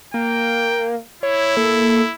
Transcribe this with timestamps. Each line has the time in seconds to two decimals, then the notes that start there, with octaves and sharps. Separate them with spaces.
0.14 A#3 G5
1.23 E4 C#5
1.57 A#3 A4